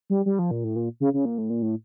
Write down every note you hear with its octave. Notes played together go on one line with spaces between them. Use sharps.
G3
G3
F3
A#2
A2
A#2
C#3
C#3
A#2
A2
A#2
A2